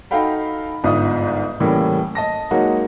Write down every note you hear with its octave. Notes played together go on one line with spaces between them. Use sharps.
D#4 F#4 A4 F5 G5 B5
G1 G#2 F4 E5 D#6
A2 C#3 E3 G3 A#3
D#5 A5 A#6
F#3 G#3 A#3 D#4 F#4